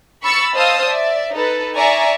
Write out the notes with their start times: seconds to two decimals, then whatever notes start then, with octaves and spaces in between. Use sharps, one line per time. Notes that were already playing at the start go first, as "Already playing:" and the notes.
0.22 B5 C#6 E6 A6 C#7
0.54 C5 D#5 F5 A5 D#6 E6
0.84 D5 E5
1.33 D#4 A4 B4
1.75 D5 E5 G#5 A#5 C#6